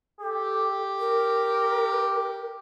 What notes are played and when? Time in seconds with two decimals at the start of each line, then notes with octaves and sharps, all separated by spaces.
0.20 G4 A4
1.00 A#4